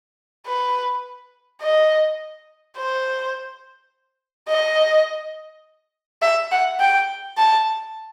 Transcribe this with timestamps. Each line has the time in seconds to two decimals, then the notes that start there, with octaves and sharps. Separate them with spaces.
0.46 B4
1.62 D#5
2.77 C5
4.48 D#5
6.22 E5
6.51 F#5
6.79 G5
7.37 A5